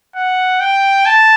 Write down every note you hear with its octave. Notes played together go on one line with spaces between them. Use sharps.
F#5
G5
A5